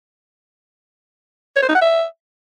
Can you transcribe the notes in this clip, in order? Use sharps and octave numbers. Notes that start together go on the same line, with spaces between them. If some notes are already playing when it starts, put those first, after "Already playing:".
C#5
C5
D#4
F#5
E5